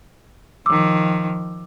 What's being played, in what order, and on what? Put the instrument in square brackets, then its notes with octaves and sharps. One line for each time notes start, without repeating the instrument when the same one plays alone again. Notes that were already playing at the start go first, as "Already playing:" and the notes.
[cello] D#3 F3 [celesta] D6 E6